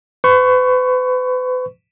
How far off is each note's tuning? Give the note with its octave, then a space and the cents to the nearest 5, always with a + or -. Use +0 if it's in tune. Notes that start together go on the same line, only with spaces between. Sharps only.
B4 +40 C#6 +0